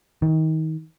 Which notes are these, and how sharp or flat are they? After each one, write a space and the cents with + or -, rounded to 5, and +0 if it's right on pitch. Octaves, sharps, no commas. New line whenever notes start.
D#3 +30